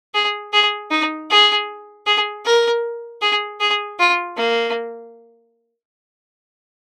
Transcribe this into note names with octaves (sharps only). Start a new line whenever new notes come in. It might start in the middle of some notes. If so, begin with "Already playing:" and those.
G#4
G#4
D#4
G#4
G#4
A#4
G#4
G#4
F4
A#3